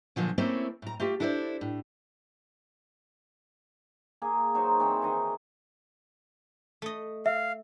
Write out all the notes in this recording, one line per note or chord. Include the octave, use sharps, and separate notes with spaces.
A#2 D3 F3 F#3
A3 A#3 C4 C#4 E4 A4
A2 A#5
A3 F4 G4
D4 E4 A4 B4 C5 D5
A2
A#3 G#4
F#3 D#4 C5 C#5
E3 C4
D#3 D#5 C#6
A3 D#5
E5 F5